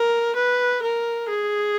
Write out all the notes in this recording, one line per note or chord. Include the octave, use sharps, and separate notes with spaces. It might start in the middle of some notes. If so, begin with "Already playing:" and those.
Already playing: A#4
B4
A#4
G#4